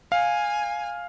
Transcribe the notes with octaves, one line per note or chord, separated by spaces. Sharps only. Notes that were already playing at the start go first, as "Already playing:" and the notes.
F5 G#5